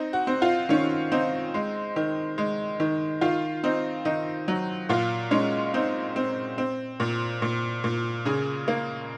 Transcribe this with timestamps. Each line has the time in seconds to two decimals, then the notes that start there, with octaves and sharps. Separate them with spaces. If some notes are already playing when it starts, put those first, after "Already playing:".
Already playing: C4 D#4
0.13 F#4
0.27 C4
0.42 F4
0.69 D#3 C#4
1.12 C4 D#4
1.54 G#3
1.96 D#3
2.38 G#3
2.80 D#3
3.21 D#3 F4
3.64 C4 D#4
4.05 D#3 D#4
4.48 F#3
4.89 A#2 F4
5.31 G#3 C#4
5.74 C4 D#4
6.16 C4
6.58 C4
7.00 A#2
7.42 A#2
7.84 A#2
8.25 C#3 G#4
8.68 A#3